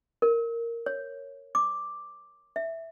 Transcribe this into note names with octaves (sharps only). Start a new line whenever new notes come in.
A#4
C#5
D6
E5